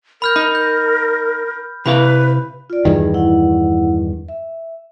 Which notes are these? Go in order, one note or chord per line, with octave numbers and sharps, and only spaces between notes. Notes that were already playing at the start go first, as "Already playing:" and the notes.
A#4 B5 F6 G6
D#4 B5
G6
C3 E4 B4 F5 B5
F4 D5
E2 G2 D#3 D#4 G#4
E4 F#5
E5